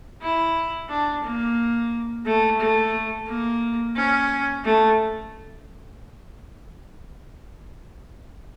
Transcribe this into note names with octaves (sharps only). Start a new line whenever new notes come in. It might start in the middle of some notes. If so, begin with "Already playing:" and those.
E4
D4
A#3
A3
A3
A#3
C#4
A3